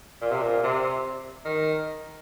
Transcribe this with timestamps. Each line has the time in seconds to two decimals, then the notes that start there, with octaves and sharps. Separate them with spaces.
0.21 A#2
0.31 C3
0.41 A#2
0.63 C3
1.45 D#3